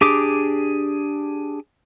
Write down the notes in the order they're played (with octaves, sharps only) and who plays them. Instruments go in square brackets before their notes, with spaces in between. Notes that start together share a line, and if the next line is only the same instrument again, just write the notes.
[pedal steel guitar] D4 G4 G#4 D6